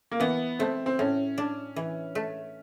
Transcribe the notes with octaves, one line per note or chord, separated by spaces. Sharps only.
A#3
E3 B3
A3 C4
C4
A2 C#4
D4
E3
A3